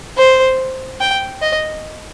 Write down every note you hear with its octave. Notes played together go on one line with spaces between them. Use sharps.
C5
G5
D#5